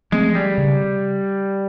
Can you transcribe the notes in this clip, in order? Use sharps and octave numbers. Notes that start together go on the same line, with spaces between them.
F3 G#3 A3 C4
G3
C#3